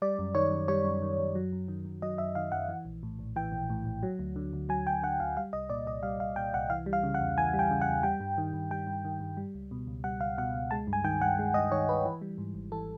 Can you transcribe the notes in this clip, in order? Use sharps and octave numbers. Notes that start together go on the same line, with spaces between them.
G3 D5
F#2
D#3 C#5
F#2
G3 C#5
F#2
D#3
F#2
F#3
F#2
D#3
F#2
F#3 D#5
F#2 E5
D#3 F5
F#2 F#5
E3
A#1
A2
A#1
E3 G5
A#1
A2
A#1
F#3
D2
D3
D2
F#3 G#5
D2 G5
D3 F#5
D2 F5
G3 F5
C2 D#5
A#2 D5
C2 D#5
G3 F5
C2 F5
A#2 G5
C2 F#5
E3 F5
G3
F5
C#3
F#5
E2
E3 G#5
G3
G5
C#3
F#5
E2
G3 G5
G2
D#3
G2
G3 G5
G2
D#3
G2
G3
C#2
B2
C#2
G3 F#5
C#2 F5
B2 F#5
C#2
G#3 A5
G2
G#5
D#3 G5
G2 F#5
G#3
G2 D#5
D#3 C#5
G2 B4
E3
G3
G#2
G#1
E3 A4